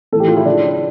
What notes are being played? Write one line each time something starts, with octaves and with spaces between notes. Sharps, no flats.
A2 E3 A4
G4
F4
E4
C#3 F3 D4